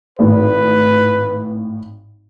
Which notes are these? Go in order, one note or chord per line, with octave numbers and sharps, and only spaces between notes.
G#1 A2 B4